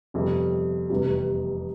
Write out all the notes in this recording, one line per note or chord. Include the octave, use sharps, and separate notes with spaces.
G1 F2 C3 G3
F1 E2 C3 G3